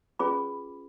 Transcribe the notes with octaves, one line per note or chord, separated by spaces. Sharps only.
C#4 F4 G#4 B4 B5 D6